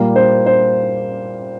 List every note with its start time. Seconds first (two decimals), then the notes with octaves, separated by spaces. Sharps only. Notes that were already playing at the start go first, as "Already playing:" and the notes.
Already playing: A#2 G3 A#3
0.16 C5
0.46 C5